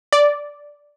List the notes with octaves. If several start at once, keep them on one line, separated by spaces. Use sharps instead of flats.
D5